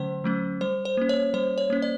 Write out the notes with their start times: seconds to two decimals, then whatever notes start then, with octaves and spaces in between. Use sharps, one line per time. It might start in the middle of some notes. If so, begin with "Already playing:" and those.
Already playing: D3 F#3 A3 C#4 C5
0.24 F#3 A3 C#4
0.61 G3 C5
0.85 C5
0.97 A#3 C#4
1.09 C#5
1.34 G3 C5
1.58 C#5
1.70 A#3 C#4
1.82 D5